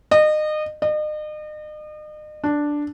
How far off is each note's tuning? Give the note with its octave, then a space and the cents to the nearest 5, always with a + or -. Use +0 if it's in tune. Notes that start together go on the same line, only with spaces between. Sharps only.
D#5 -30
D#5 -40
D4 +0